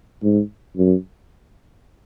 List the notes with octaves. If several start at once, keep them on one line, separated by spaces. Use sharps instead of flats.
G#2
F#2